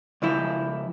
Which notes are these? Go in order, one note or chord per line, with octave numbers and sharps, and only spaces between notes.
C#2 F3 E4